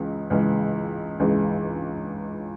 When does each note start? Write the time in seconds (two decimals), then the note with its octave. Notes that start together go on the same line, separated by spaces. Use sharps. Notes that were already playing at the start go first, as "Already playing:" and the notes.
Already playing: C#2 C#3 E3 G#3
0.30 C#2 C#3 E3 G#3
1.20 C#2 C#3 E3 G#3